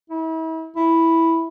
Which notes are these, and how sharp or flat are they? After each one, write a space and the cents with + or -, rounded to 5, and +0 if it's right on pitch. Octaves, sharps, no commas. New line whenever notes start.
E4 -40
E4 -5